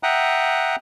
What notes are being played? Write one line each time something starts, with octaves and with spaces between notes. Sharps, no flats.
E5 F#5 G5 A#5 D#6 F#6